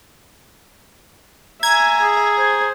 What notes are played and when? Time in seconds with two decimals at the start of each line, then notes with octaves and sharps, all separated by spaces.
1.63 E5 G#5 A#5 G#6
2.02 G#4
2.38 C5